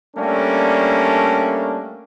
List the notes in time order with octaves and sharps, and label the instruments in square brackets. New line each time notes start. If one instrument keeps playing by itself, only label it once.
[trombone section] G3 A3 A#3 C#4 D4 A4